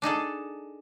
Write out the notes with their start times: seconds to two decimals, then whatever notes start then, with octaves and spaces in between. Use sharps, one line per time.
0.02 D4 D#4 G#4 A4